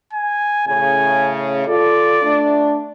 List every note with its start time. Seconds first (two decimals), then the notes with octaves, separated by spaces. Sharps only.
0.13 G#5
0.67 A2 C#3 G#5
1.67 F4 A4 D5
2.21 A3 D4